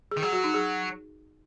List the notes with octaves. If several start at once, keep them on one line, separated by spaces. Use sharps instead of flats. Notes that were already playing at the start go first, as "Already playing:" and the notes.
G#4
D#3
F#3 G#4
F#4
D#4
G#4